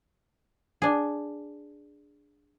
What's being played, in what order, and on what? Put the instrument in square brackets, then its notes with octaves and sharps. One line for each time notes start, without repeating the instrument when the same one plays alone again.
[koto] D4 G#4